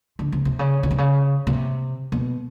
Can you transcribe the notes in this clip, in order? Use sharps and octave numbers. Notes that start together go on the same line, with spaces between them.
D3
C#3
C3
C#3
C#3
C3
C#3
C3
B2